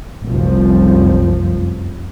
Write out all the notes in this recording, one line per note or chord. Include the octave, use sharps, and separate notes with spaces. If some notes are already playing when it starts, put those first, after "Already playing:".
F1 C2 F#2 F3